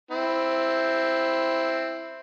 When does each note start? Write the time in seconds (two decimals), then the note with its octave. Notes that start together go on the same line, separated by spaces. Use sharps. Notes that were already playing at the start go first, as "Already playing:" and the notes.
0.11 C4 E4